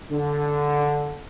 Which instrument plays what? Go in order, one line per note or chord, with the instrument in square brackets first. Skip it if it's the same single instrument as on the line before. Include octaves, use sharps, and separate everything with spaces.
[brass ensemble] D3